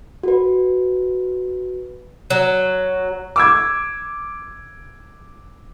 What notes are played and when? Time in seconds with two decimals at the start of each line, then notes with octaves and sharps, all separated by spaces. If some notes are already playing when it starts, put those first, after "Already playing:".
0.23 F#4 B4
2.30 F#3
3.36 D6 E6 G#6